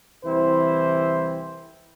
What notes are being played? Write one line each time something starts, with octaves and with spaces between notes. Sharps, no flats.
C2 E3 C4 E4 C5